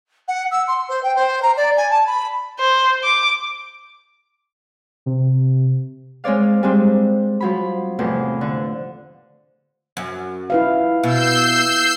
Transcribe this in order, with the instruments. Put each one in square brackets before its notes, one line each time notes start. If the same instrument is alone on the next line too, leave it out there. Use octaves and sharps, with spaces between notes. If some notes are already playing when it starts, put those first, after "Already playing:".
[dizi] F#5
E6
C6
C5
G5
C5
A#5
D5
G#5
A5
B5
[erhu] C5
D6
[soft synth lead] C3
[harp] G#3 C4 C#5 D5 F5
G3 G#3 C4 D4
F3 F#3 B5
E2 A2 C3 F3
D3
[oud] F#2
[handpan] E4 B4 F5
[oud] B2 [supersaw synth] E6 G6 C7